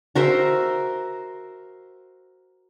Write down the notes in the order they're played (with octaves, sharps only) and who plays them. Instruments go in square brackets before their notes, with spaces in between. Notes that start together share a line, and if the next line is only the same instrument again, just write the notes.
[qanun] F#4 A#4 C5 E5